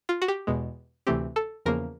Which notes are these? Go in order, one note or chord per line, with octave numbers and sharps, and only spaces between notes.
F4
F#4
G4
E2 B2 G#3
D2 C3 E3 A3 C4 G4
A4
E2 C#3 F3 A#3 A#4